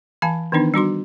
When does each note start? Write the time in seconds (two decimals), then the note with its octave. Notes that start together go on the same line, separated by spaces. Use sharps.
0.22 E3 F5 G#5 A5
0.52 D#3 E3 B3 D4 D#4
0.74 G3 D4 F#4 C6